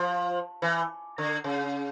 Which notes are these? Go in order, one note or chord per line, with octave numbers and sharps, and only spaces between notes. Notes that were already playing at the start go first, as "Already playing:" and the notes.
Already playing: F3
E3
D3
C#3